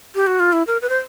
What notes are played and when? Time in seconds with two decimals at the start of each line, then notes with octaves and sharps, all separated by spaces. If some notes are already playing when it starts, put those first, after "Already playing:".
0.15 G4
0.27 F#4
0.40 F4
0.53 E4
0.67 A#4
0.82 B4
0.89 C5